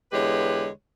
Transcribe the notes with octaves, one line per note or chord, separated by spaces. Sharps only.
E2 D3 G#3 G4 B4 C#5